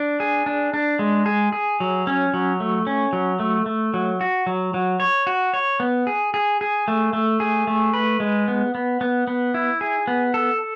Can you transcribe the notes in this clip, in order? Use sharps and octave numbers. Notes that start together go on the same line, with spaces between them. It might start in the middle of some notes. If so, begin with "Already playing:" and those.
Already playing: D4
G#4
D4
D4
G#3
G#4
G#4
F#3
C#4
F#3
A3
C#4
F#3
A3
A3
F#3
F#4
F#3
F#3
C#5
F#4
C#5
B3
G#4
G#4
G#4
A3
A3
G#4
A3
B4
G#3
B3
B3
B3
B3
E4
G#4
B3
A4